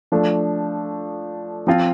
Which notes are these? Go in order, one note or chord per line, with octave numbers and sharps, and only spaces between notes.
F3 A3 D4
F3 C4 F4